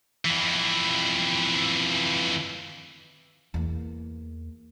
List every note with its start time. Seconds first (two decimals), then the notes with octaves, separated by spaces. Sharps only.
0.25 F2 E3
3.54 E2 A#3